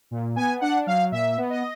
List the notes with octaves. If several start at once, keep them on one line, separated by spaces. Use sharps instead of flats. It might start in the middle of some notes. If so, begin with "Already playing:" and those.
A#2
B3 G#5
D4 F#5
F#3 F5
A#2 E5
B3
D#5